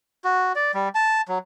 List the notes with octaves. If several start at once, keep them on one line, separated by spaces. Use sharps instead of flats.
F#4
D5
G3
A5
F#3